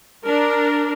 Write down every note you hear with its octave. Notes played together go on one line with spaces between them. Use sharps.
D4 A#4